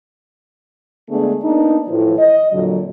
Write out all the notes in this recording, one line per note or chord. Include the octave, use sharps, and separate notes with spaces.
D3 G#3 A3 B3 D4 G#4
A#3 B3 D4 D#4
A2 E3 F3
D#5
F2 A#2 D3 F#3